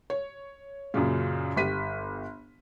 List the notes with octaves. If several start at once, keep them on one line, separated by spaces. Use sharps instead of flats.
C#5
F#2 A#2 C#3
G1 G4 B6 D#7